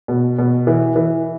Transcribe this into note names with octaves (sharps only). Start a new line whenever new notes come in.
B2
B2
E3
E3